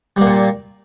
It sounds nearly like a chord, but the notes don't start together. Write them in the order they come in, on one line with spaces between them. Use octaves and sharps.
G3 A#3 A#2